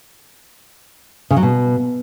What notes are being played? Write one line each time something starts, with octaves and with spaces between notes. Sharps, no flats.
C#3
F#3
B2